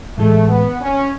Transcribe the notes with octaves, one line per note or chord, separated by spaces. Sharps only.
A2 E3 G#3 A3
B3
C#4